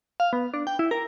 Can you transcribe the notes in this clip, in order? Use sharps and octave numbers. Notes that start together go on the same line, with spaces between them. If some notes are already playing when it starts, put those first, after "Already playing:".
F5
B3
D4
G5
E4
A#4